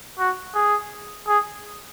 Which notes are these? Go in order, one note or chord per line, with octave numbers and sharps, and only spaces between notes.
F#4
G#4
G#4